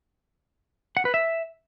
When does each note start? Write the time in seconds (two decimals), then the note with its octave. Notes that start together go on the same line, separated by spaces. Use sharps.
0.97 F#5
1.05 B4
1.14 E5